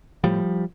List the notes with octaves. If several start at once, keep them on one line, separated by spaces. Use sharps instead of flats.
A2 F3 G3